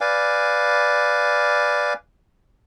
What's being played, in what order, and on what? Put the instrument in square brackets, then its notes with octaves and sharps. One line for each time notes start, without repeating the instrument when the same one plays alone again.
[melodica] B4 D5 F5 G#5